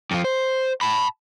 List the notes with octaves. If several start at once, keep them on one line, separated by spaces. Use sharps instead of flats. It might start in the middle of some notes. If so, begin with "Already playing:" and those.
F2 F3
C5
A5 B5